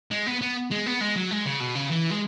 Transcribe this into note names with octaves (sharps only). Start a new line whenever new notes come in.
G#3
B3
B3
G#3
B3
G#3
F#3
G#3
C#3
B2
C#3
E3
G#3